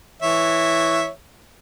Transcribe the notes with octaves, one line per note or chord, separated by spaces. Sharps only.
E3 C#5 E5